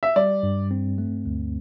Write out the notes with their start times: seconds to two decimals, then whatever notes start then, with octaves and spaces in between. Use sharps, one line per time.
0.03 E5
0.16 G3 D5
0.43 G2
0.71 C4
0.98 A3
1.25 D2